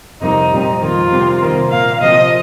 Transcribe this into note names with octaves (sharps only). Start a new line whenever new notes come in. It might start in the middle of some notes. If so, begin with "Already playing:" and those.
F2 C3 G3 A#3 D#4
A#2 G3 C4
F2 D#3 A#3 F4
C3 G3 C4
C3 D#3 A#3
A#2 A#3 F5
C3 F3 C4 D#5